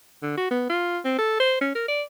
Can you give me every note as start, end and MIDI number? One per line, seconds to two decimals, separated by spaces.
0.22 0.35 50
0.37 0.51 66
0.51 0.65 59
0.70 0.98 65
1.05 1.15 60
1.18 1.37 69
1.40 1.56 72
1.61 1.70 61
1.75 1.83 70
1.88 2.02 74